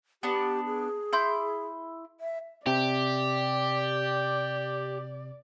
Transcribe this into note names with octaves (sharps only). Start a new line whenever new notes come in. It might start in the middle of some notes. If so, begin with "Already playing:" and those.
B3 D4 G4
G#4
E4 C6 G6
E5
C3 G4 D5